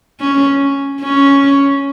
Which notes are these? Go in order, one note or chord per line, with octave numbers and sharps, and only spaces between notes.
C#4
C#4